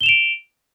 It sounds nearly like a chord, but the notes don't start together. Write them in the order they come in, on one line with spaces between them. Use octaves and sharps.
G7 E7 F7 D7